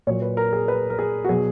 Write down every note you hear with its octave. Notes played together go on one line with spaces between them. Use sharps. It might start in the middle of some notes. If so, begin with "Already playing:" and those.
A#2 F#3 C#5
B4
A#4
G#4
B4
A#4
G#4
F#4
B2 F#3 G#4